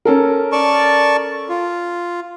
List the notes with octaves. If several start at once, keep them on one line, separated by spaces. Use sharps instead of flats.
C#4 A4 A#4
D5 A5 C#6
F4